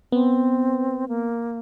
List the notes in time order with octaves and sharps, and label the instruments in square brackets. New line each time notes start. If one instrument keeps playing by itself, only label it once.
[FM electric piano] B3 [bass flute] C4
[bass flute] A#3